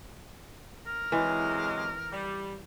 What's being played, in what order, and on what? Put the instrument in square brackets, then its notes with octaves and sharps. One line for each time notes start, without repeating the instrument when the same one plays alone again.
[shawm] A#4
[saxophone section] C3 F#3 G#3 [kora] E3
[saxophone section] G3